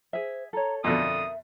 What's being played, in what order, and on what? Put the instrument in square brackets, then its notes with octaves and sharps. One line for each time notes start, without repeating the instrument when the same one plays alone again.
[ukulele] G#4 E5 [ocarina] C5
[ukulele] A4 C#5 [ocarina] A#5
[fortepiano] F2 B2 D3 [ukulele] A#4 [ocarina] E5 [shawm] D#6